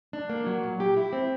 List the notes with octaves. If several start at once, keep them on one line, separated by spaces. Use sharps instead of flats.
D4
A#3
F#3
A#2
G4
E4
C4